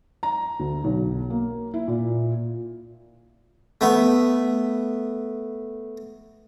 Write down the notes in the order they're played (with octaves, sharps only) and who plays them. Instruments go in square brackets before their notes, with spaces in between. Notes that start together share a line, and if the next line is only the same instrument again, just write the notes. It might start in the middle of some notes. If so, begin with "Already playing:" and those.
[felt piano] A#5
D2
B1
A#3
E4
A#2
[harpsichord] A3 B3